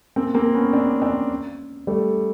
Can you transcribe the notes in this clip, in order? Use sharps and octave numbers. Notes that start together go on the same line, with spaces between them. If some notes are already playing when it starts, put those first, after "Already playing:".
A#3 C4
A#3 C4
B3 C#4
C4 D4
C4 D4
G3 A3